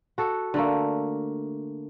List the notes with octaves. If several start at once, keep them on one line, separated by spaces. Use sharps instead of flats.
F#4 A4
D3 A3 A#3